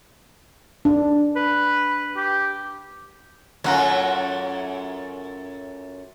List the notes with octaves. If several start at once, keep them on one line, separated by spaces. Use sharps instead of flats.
D4
B4
G4
F#2 A3 F4 C#5 F#5 A#5